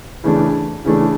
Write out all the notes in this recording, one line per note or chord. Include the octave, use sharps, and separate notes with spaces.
C#3 E3 A3 D4
C#3 E3 A3 D4